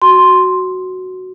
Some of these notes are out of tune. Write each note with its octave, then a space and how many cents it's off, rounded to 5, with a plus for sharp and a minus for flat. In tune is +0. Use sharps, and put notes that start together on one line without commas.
F#4 +0 C6 +0